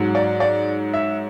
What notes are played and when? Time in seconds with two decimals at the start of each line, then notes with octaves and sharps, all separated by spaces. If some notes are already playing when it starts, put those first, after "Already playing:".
Already playing: G#2 F#3
0.15 D5
0.40 D5
0.94 E5